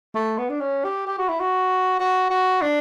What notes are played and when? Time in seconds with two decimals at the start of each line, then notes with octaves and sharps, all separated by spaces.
0.15 A3
0.38 B3
0.50 D4
0.61 C#4
0.84 G4
1.07 G4
1.18 F#4
1.29 E4
1.40 F#4
1.99 F#4
2.30 F#4
2.62 D4